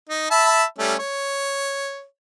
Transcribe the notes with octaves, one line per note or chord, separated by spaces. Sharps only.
D#4
E5 A5 B5
G3 A3 C#4
C#5